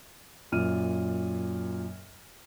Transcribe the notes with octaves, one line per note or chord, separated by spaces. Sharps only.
F#2 A#2 F6 D#7